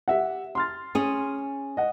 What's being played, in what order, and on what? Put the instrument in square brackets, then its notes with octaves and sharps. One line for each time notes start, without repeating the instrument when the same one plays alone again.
[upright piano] G4 E5 F#5
C6 F6 A6
[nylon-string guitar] C#4 G#4
[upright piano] D#5 F#5